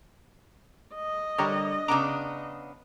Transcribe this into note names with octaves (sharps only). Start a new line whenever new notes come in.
D#5
D3 G3 A#4 C#5
C#3 B3 D4 A#5 D6